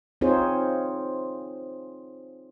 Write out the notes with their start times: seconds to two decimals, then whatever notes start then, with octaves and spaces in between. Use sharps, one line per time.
0.21 C4 D#4 F4 G#4 C5 C#5